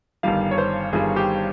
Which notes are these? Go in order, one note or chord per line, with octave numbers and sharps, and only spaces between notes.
G1 G2 D#3 G3 F5
C#5
C5
G1 G2 D#3 G3 G#4
G4